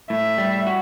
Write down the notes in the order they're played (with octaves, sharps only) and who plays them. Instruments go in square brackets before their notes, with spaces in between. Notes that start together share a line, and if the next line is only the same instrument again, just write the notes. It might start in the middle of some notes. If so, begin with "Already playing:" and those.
[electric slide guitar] A2 [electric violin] E5
[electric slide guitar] G3
F#4